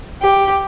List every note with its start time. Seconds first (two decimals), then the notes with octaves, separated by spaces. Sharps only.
0.21 G4